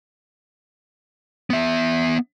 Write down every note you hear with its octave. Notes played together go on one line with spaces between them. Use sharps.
B3 E5